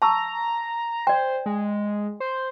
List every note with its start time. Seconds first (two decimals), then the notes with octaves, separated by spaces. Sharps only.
0.02 A5 A#5 C#6 E6
1.07 C5 D5 G5
1.46 G#3
2.20 C5